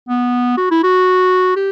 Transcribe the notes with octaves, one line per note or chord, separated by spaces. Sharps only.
B3
F#4
E4
F#4
G4